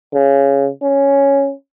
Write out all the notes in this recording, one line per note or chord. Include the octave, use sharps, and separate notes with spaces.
C#3
C#4